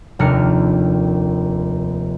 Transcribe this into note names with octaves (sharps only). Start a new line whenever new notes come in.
F1 D#2 D4 A#4 F6 C#7